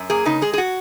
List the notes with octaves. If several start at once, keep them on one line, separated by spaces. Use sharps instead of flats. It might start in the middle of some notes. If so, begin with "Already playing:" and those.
Already playing: F#2
A#3 G#4
C#3 D#4
G#3 G#4
G#4
F#4